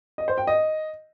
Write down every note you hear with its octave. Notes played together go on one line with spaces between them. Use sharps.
D#5
C5
G5
D#5